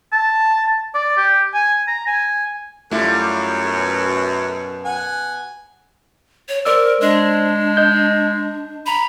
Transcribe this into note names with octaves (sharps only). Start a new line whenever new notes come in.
A5
D5
G4
G#5
A#5
G#5
F#2 G3 A3 E4 F4
B2
F#5 G#5
C#5
A#4 C5 D5 E6
G#3 D4
D#5 G6
A#5 B5